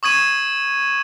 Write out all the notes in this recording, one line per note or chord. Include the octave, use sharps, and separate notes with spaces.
C#6 D#6 G#6 D#7